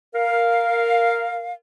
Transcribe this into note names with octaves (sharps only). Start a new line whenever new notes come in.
A#4 F5